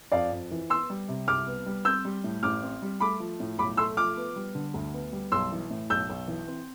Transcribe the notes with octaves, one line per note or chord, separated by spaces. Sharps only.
F2 D5 F5
F2
E3
B3 C6 E6
G3
C3
C2 D6 F6
B3
G3
C4 E6 G6
G3
A2
A1 D6 F6
C4
G3
A3 B5 D6
F3
A2
B1 B5 D6
A3 C6 E6
F3 D6 F6
B3
G3
D3
D2
B3
G3
B1 C6 E6
E3
A2
B1 E6 G6
B1
E3
C4